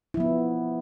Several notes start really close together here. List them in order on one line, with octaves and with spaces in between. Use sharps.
E4 F3 B3